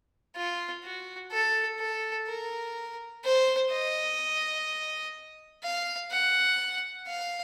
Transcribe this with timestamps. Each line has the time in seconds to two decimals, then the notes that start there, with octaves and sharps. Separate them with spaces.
0.36 F4
0.84 F#4
1.32 A4
1.80 A4
2.28 A#4
3.24 C5
3.71 D#5
5.64 F5
6.11 F#5
7.07 F5